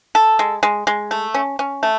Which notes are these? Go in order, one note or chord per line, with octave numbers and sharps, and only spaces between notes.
A4
G#3
G#3
G#3
A3
C#4
C#4
A3